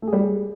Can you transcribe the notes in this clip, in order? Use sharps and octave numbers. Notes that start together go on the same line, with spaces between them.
A3
G#4
G3
G#3
G#4